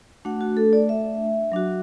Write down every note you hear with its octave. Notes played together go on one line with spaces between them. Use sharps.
A3 D4 F#4 F#5
F#4
A4
D5
E5
F#3 D4 F#4